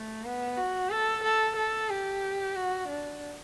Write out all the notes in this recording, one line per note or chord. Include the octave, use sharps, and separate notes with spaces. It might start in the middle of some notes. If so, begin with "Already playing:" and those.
Already playing: A3
B3
F#4
A4
A4
A4
G4
F#4
D4